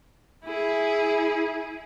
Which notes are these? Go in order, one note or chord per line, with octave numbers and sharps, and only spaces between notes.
E4 G#4